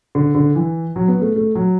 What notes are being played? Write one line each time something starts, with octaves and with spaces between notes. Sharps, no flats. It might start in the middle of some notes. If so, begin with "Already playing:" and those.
D3
D3
E3
F#3
B3
A3
A3
F#3